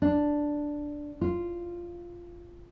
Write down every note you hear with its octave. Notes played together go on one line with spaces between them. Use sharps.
D4
F4